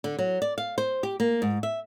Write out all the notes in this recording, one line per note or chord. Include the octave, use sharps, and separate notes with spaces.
D3
F#3
D5
F5
C5
G4
A#3
G#2
E5